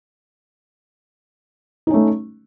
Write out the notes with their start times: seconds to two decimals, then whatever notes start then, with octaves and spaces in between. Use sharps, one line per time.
1.87 D#4
1.90 C#4
1.94 A3